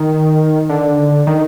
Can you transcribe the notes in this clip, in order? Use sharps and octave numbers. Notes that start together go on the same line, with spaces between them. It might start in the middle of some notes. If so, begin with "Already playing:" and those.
Already playing: D#3
D3
D#3